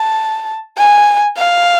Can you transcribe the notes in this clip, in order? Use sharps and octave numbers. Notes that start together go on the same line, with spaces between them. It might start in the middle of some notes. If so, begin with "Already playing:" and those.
Already playing: A5
G#5
F5